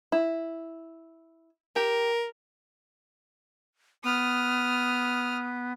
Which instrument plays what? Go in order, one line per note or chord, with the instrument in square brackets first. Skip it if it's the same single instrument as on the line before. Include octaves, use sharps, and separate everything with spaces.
[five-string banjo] E4
[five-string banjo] G4 [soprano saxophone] A#4
[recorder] B3 [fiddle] D#6 F6